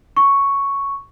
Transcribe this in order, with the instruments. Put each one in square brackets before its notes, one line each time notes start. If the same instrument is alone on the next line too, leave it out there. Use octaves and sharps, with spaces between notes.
[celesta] C#6